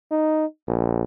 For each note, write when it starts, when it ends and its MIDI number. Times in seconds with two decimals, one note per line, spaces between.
0.11 0.45 63
0.68 1.03 34